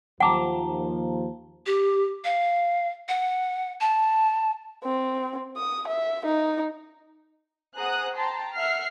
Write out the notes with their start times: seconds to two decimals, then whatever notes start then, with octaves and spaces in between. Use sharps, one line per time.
0.20 D#2 F3 F#5 G5 A5 A#5 D6
1.66 G4
2.25 F5
3.09 F#5
3.81 A5
4.84 C4
5.57 D#6
5.88 E5
6.26 D#4
7.76 G#4 C5 F#5 A#5 D#6 F#6
8.15 G5 A5 A#5 C6
8.54 E5 F#5 F6 C7